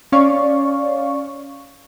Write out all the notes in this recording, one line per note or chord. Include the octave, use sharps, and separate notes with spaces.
C#4 C#5 D5 F5 C#6